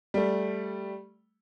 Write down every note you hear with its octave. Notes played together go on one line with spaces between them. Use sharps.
G3 A3